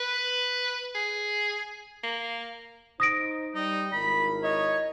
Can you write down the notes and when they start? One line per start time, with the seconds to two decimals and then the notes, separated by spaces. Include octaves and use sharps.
0.01 B4
0.95 G#4
2.03 A#3
3.00 D#4 C5 D#6 A#6 D7
3.55 G3 D#4
3.93 G#1 E4 A#4 B5
4.43 C#5 D#5